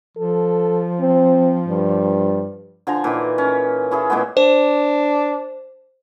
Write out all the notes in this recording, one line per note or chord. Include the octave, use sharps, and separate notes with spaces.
F3 A4
C4
G2
D3 F3 G#5 A#5
A#2 D#3 E3
C#4
C#4 E4 G#4 A4
A#2 G#3 A3 B3
D4 C5